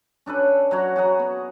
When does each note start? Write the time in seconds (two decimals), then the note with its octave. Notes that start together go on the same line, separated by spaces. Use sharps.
0.26 C#4 D4 A4 B4
0.71 F#3 F#4 C#5 F#5
0.96 F#4 G#4 F#5 A#5
1.19 B3